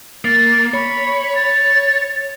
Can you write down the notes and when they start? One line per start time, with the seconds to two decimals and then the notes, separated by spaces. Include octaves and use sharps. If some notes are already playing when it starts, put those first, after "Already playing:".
0.25 A#3 A6
0.74 C#5 B5
1.35 A6